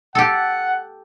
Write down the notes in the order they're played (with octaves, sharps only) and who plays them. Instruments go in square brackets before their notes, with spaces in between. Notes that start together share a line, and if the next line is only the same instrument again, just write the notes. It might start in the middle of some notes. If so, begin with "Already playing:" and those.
[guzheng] G4 A4 [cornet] F#5